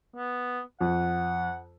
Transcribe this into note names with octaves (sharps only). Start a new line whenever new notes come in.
B3
F2 F#5